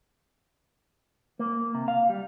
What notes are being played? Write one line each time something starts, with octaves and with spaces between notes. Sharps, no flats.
A#3
C3
F5
G3